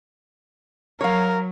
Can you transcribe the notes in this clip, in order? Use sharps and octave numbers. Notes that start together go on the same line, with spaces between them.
F#3 A#4 C#5 F5